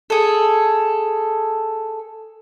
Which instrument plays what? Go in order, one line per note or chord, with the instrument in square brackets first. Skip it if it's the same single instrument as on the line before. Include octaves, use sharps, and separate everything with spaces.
[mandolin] G#4 A4